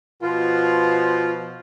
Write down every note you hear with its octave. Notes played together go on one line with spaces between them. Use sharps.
B2 F3 F4